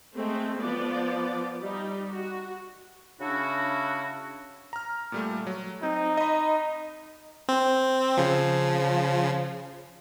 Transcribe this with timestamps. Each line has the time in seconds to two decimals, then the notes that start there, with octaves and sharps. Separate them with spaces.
0.15 G#3 A3 C4
0.59 F3 B3 D5
1.61 G3 D#4
2.10 F#4
3.20 C#3 C#4 D4 E4 F#4
4.73 A#5 F6
5.12 A#2 G3 A3
5.47 F#3
5.83 C4 D#4
6.17 D#5 B5
7.49 C4
8.17 C#3 F3